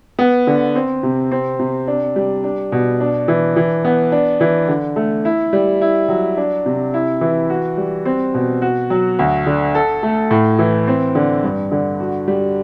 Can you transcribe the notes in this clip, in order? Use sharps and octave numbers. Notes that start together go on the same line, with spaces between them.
B3
D3
C4
C3
C4
C3
D4
G3
D4
B2
D4
E3
E3
B3
D4
E3
D3
A3
E4
G3
E4
F#3
D4
C3
E4
E3
F#4
G3
C4
B2
F#4
F#3
D2
D3
A4
A3
A2
E3
C4
D3
G2
D3
F#4
G3